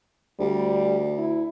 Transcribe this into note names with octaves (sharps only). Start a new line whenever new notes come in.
D2 G3
E4